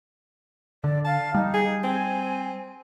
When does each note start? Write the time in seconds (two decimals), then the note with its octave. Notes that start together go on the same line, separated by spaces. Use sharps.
0.84 D3 D5
1.05 F5 A5
1.34 G3 D#4
1.54 G#4
1.84 C4 G#5